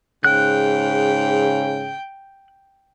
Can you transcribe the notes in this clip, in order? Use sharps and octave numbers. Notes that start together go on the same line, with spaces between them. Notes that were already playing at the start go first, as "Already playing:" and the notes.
G#2 C#3 G5 F#6